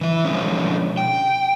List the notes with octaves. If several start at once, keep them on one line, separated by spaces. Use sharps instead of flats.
E3 E5
B2 D3 F3 G#3 C#4
G5